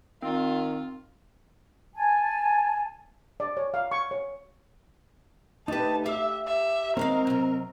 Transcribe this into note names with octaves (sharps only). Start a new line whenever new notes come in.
D#3 C4 F4
G#5 A5
D5
C#5
F5
C#6
C#5
D2 D#4 G4 B4 A5
G4 E5 F5 E6
E5
D#2 G#3 C4 A#4 D#5 F5
C3 F#3